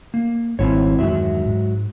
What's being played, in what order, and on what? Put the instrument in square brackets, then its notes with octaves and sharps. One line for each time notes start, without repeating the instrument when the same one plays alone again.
[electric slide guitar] A#3
[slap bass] G#1 G3 [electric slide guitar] C4 E4 C#5
[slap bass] E2 G2 D#3 [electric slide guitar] F#3 G#3 E5
[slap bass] G#2